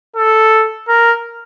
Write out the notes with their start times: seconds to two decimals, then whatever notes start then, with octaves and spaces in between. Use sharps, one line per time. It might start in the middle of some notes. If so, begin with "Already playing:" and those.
0.17 A4
0.88 A#4